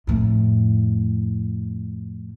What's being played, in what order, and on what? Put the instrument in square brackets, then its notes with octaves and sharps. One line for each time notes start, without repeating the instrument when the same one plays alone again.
[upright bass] F2 A2